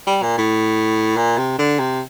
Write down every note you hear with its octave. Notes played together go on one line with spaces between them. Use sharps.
G3
A#2
A2
A#2
C3
D3
C3